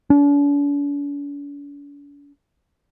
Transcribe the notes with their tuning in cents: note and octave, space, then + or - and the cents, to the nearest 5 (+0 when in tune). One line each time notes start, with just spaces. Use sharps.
D4 -45